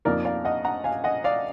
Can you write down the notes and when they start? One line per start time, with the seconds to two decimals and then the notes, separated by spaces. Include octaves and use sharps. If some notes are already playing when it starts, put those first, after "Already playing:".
0.05 F2 F3 A#3 D#4 A#4 D5
0.25 D5 F5
0.45 D#5 F#5
0.65 F#5 A#5
0.84 F5 G#5
1.04 D#5 F#5
1.24 D5 F5